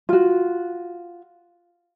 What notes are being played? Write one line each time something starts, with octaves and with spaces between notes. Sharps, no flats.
F4 F#4